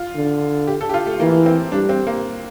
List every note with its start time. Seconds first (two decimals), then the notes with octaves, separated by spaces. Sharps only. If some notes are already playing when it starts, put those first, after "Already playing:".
Already playing: F4
0.16 D3
0.67 G4
0.81 A4
0.90 G4
0.94 F4
1.07 A3
1.20 E3 A#3
1.46 C4
1.72 G3 D4
1.89 C4
2.07 A#3